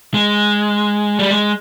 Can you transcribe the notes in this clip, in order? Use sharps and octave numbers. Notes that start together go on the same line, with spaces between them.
G#3
G3
G#3